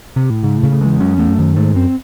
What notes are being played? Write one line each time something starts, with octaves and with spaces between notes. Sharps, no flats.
C3
A2
G#2 C#3
A2
C#3
A2
E2 G#3
F#2 C#4
E2 A3
F#2
D#3
G#2 A3
F#2 C4